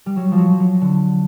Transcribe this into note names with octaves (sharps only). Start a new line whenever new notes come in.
G3
F#3
F3
F#3
F#3
D3